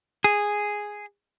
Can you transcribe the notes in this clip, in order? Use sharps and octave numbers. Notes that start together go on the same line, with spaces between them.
G#4